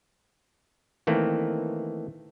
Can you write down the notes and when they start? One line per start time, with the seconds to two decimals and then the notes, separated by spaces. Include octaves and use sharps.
1.07 D#3 E3 A3 A#3 C4